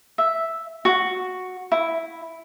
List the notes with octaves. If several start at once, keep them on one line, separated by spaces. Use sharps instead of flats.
E5
F#4
E4